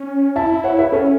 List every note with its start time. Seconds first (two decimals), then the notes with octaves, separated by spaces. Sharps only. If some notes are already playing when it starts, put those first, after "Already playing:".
Already playing: C#4
0.36 E4 E5 A5
0.64 C#5 F#5
0.79 B4 E5
0.92 C#4 A4 C#5